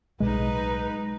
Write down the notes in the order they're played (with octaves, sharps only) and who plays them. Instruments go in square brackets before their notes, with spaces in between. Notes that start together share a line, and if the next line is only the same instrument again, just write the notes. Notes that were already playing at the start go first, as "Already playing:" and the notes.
[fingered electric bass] B1 A2 [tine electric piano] G#3 [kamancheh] D#4 B4